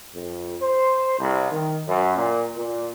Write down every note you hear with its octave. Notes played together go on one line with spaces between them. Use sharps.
F2
C5
C2
D#3
F#2
A#2
A#2